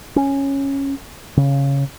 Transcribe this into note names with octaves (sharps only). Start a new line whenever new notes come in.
C#4
C#3